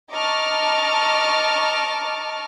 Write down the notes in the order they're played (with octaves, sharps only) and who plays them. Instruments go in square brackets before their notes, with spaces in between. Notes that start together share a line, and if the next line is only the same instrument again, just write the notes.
[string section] D#5 A5 A#5 C#6 D6 F6